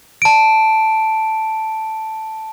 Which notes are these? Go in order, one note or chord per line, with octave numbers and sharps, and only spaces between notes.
A5 D7